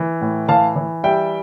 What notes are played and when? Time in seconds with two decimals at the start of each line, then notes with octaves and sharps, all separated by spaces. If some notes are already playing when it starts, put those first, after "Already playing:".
Already playing: E3
0.21 A2
0.49 E3 F5 A5
0.76 E3
1.04 G3 E5 G5